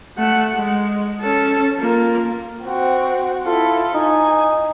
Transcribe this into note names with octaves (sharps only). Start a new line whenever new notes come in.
A3 F#5
G#3
C#4 A4
A#3 F4
C4 F#4
E4 F4 A4
D#4 G#5